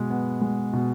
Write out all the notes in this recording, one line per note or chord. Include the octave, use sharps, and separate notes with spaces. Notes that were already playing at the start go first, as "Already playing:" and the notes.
Already playing: B2 G#3 B3
B3
G#3
B2